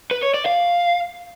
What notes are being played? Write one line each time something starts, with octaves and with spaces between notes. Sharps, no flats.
B4
C#5
D5
F5